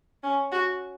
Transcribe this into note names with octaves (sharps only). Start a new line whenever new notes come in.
C#4
F#4